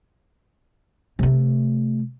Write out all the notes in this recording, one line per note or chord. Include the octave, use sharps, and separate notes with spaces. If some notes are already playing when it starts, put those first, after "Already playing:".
C3 A3